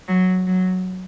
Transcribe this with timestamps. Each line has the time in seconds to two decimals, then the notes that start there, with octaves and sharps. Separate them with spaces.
0.08 F#3
0.47 F#3